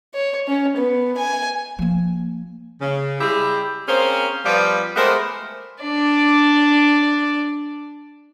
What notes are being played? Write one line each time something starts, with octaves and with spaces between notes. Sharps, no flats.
C#5
C#4
B3
G#5
F3 A#3
C#3
G3 G#3 E4 G4 G#4
A#3 C4 C#4 G#4 C5
F3 G3 B3 F4 B4 D5
G#3 A3 B3 G4 A#4 C5
D4 D5